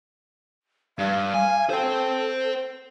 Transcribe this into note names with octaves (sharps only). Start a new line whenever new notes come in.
G2 F5
G#5
A4 C5 G5